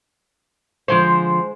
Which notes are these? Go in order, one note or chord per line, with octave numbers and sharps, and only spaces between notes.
D3 F3 G#3 C5